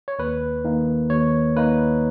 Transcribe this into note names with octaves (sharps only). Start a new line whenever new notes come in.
C#5
D#2 B4
D#3 A#3 D#4
D#2 C#5
D#3 A#3 D#4 B4